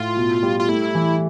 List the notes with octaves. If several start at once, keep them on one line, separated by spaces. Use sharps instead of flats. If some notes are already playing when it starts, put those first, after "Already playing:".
Already playing: A2 F4
B2
G3
F4
A3 E4
E3